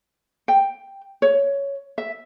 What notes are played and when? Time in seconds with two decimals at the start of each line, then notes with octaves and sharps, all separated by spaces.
0.48 G5
1.22 C#5
1.98 E5